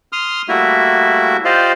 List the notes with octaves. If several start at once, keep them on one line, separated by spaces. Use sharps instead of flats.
C6 D#6 F6
G3 A3 A#3 E4 F#4 E5
F4 G4 C5 D5 D#5 F5